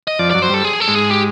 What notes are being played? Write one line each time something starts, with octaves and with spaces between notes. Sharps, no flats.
D#5
F2 F3 D5
F#2 F#3 D5
F#3 C5
G2 G3 A4
G#4
A4
G#2 G#3
G#4
G4